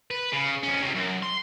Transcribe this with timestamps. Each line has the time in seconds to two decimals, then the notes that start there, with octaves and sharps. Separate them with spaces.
0.11 B4
0.32 C#3
0.63 F2 C#4
0.82 C#2 C3
0.95 F#2
1.23 C6